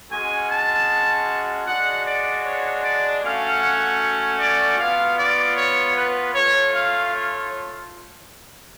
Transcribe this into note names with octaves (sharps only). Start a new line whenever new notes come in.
G#3 C#4 F#4 G#5
A5
G#3 D4 F#4 F#5
D5
C#5
D5
A3 C#4 F#4 F5
F#5
D5
B3 F4 F5
D5
C#5
B4
A3 F4 C#5
F5
C#5